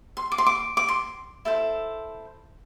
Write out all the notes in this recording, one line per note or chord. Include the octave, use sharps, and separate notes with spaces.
C6
D6
C6
D6
D6
C6
E4 A4 C5